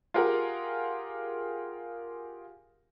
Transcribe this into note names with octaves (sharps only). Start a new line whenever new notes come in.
F4 G4 G#4 A#4 F5 F#5